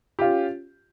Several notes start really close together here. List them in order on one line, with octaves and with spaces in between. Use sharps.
G4 F4 C#4